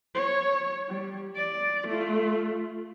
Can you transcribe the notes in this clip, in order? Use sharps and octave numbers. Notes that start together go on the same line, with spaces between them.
C#5
G3
D5
A3 F4